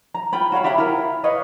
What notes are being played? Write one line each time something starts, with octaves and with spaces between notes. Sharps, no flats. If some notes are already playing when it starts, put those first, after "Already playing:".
A#5
F4 G5 B5
F#4 C#5 F5 B5
G4 E5 A#5 B5
E4 F4 A#4 F5
B4 C#5 D#5 F5